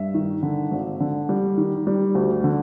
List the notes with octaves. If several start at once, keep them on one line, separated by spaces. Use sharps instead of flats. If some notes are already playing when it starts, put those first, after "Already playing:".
Already playing: G2 E5
D#3
D3
G#1
D3
G3
D#3
G3
D2
D3